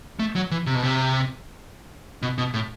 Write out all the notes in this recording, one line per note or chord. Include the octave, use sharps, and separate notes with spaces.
A3
F#3
E3
C3
B2
C3
B2
B2
A2